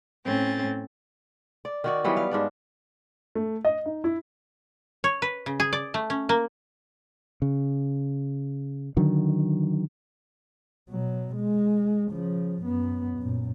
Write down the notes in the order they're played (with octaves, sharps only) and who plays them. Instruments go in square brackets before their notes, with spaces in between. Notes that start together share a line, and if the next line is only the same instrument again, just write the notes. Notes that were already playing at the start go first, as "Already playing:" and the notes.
[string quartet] A2 C4 C#4 A6
[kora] D5
D#3 F#4 D5
E3 F#3 G3 B3
F5
G#2 D4 D5
[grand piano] A3
D#5
D#4
E4
[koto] C#5
B4
C#3
G#4
D5
A3
C#4
A#3
[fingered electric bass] C#3
D3 D#3 F#3 D4
[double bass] B2 F#3
G#3
C#3 F3
F#2 B3
F#2 A#2